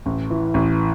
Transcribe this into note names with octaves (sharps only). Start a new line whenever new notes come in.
A1
E3
A1